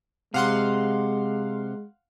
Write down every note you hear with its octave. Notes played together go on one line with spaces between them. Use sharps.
C3 G#3 F5 F#5 C6